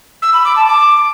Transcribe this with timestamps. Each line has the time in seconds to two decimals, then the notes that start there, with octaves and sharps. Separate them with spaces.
0.22 E6
0.33 B5
0.44 D6
0.56 A5
0.67 D6